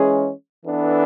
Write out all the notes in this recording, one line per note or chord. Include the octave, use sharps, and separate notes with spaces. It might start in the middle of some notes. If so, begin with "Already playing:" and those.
Already playing: E3 G#3 C#4 G#4
E3 B3 D4 A4